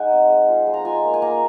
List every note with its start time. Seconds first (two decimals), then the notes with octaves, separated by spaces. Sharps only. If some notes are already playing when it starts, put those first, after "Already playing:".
Already playing: G#3 D#4 F#5 G#5
0.12 C4
0.30 G#3
0.48 F4
0.67 G#3
0.74 A#5
0.85 F4 G#5
1.03 A#3
1.14 G#5
1.22 A#3 A#5